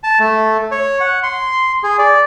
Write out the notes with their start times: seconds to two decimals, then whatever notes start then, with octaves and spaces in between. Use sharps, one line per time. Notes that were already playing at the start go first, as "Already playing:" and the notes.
0.03 A5
0.20 A3
0.72 C#5
1.00 F#5
1.23 C6
1.83 G#4
1.99 D5